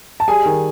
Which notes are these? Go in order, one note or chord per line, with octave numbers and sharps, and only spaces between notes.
A5
G3 G#4 G#5
D#3